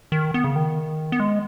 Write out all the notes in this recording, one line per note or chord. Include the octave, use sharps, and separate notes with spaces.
D#3
B3
C#3
D#3
B3
G#3